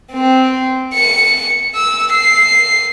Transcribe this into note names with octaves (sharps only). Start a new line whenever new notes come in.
C4
C#7
E6
C7